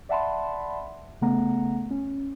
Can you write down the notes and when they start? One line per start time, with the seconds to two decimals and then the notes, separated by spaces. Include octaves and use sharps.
0.09 D5 E5 F#5 A5 B5 C6
1.21 C#3 A3 B3 F#5 A#5
1.90 C#4